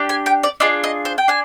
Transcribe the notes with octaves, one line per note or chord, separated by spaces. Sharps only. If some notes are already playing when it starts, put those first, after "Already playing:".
Already playing: D4 G4
G#5
G5
D5
D4 F4 G#4 D#5
D#5
C5
G5
D4 G#5